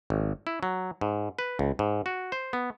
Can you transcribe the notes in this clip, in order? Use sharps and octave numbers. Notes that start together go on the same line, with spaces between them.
G#1
E4
F#3
G#2
B4
C#2
G#2
F#4
C5
B3